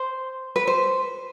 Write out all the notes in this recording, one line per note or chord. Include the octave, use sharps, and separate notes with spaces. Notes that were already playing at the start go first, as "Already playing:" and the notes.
Already playing: C5
B4
C5